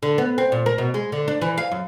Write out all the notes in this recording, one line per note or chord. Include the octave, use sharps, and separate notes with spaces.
D3
B3
C4
A#2
A#4
B2
G#3
D3
D4
E3
F5
F#2